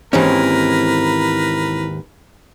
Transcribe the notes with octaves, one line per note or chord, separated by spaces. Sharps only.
D#2 G#2 E3 C4 C#4 A#4 B4